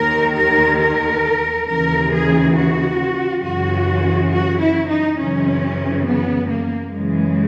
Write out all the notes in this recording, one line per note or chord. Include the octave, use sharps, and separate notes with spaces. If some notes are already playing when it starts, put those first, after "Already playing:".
Already playing: D#2 D#3 A#4
A#4
A#4
D#2 C#3 E3 A#4
G#4
F#4
F#2 C#3 E3 F#4
F#4
E4
D#4
F#2 C#3 E3 C#4
B3
A#3
F#2 C#3 E3 G#3